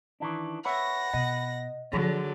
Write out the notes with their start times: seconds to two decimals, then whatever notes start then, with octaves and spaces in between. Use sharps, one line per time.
0.20 D#3 E3 D4
0.65 B4 C#5 E5 F#5 B5 A#6
1.14 B2 D#5
1.93 D3 F3 F#3 G#4